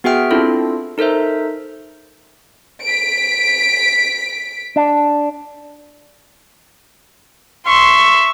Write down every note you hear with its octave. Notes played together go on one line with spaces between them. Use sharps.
B3 F#4 G#4 E5 G5 F6
C4 D4 E4 F4 A4
D#4 A4 A#4 C5 E5
B6 D7
D4
E5 C6 C#6